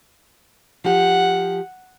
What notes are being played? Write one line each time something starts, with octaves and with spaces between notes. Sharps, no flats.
F3 G4 F#5